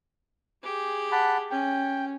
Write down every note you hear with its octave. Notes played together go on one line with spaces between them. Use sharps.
G4 G#4
F#5 A5 B5
C#4 G5